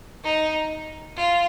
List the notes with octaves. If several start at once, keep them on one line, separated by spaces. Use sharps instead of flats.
D#4
F4